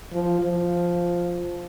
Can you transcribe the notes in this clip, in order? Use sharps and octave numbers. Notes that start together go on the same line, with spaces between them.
F3
F3